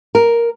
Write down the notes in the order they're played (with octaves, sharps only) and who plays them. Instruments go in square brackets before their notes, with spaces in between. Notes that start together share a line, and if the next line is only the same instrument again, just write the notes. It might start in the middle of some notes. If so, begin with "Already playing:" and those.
[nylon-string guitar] A#4